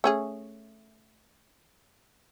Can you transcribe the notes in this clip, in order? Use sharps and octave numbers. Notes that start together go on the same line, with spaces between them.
A3 C#4 G#4